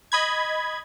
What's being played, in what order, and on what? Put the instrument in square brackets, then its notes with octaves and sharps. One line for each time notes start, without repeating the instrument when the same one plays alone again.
[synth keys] D#5 B5 G#6